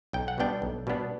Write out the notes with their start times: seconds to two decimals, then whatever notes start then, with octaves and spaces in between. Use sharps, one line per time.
0.13 B1 G5
0.28 F#5
0.38 B2 G3 B3 D4 G5
0.62 B1
0.87 B2 G3 B3 D4